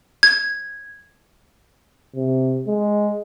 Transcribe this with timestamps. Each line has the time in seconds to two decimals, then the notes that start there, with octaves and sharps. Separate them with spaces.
0.23 G#6
2.15 C3
2.67 G#3